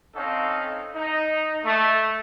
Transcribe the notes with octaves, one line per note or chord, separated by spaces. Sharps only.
C4 C#4 D#4 A4 F5
D#4
A3